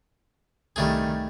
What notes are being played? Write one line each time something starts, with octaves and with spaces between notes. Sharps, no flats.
C2 D#3 G3 A3 G#4